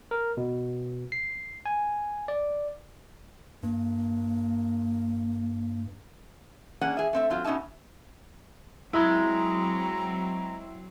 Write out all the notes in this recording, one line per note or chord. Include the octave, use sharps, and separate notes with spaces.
A#4
B2
C7
G#5
D5
G2 A#3
A#3 C#4 D4 G#4 F#5
G#4 E5
A3 C4 E5
F#3 C4 F4
B2 C#4 D#4 E5 A5
F#3 G#3 C4 E4 A#5